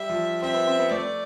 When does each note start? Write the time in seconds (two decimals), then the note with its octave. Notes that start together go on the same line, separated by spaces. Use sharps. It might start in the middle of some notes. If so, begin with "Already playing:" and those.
Already playing: G3 E5
0.09 F3
0.42 C4 E5
0.54 B3
0.67 C4
0.79 B3
0.91 A3 D5